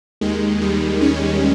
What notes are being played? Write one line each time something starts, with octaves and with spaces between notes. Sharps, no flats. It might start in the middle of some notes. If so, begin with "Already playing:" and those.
D#2 D#3 G#3
G3
C#4